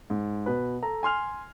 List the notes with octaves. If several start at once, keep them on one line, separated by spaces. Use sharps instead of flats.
G#2
B2 B4
A4 A#5
G#5 C6 F6 F7